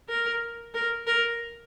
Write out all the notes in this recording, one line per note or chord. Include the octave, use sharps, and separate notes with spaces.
A#4
A#4
A#4